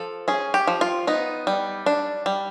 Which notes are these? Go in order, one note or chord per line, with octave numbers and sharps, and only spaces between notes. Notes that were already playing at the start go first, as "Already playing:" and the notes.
Already playing: F3 A4
C#4 G#4
G4
F3
F4
B3 D#4
G3
D4
G3